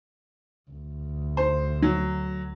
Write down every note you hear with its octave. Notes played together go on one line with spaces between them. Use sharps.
D2
C5
F#3